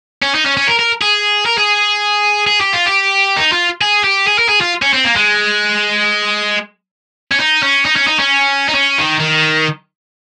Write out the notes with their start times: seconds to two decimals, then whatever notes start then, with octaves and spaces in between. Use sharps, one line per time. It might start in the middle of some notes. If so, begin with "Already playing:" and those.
0.23 C#4
0.35 D#4
0.46 C#4
0.57 C#4
0.67 A#4
0.79 A#4
1.02 G#4
1.46 A#4
1.58 G#4
2.47 G#4
2.61 G4
2.73 F4
2.86 G4
3.36 D#4
3.52 F4
3.81 G#4
4.04 G4
4.27 G#4
4.38 A#4
4.49 G#4
4.61 F4
4.82 C#4
4.93 C4
5.05 A#3
5.16 G#3
7.32 C#4
7.40 D#4
7.63 C#4
7.85 D#4
7.96 C#4
8.07 D#4
8.19 C#4
8.69 D#4
8.75 C#4
8.98 D#3
9.20 D#3